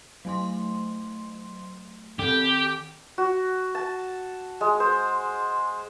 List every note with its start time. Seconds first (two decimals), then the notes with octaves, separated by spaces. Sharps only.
0.25 F#3 A3 C6
2.19 D#3 C4 G4 A4
3.18 F#4
3.75 A5
4.61 G#3
4.80 C5